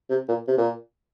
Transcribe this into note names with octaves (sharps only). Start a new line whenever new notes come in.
C3
A#2
C3
A#2